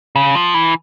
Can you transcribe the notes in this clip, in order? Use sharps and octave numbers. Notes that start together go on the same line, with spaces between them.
C#3
F3
E3